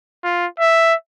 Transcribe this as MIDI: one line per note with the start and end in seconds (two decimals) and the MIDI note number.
0.24 0.46 65
0.60 0.94 76